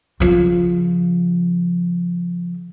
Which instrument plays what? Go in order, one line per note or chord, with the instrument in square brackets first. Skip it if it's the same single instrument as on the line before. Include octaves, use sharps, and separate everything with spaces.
[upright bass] C#3 F3